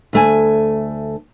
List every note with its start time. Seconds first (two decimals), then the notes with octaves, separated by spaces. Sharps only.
0.13 D2 A3 G#5